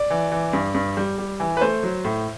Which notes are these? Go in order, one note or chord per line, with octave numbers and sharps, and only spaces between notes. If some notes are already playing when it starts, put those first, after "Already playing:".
Already playing: D5
E3
E3
G2
G2
G3
G3
E3
B4
A3 C5
F#3
A2